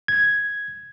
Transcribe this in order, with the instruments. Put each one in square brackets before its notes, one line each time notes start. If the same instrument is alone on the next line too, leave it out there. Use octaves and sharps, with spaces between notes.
[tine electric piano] G#6